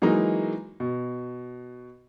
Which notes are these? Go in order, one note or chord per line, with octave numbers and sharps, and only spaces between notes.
E3 F#3 G#3 A#3 D#4
B2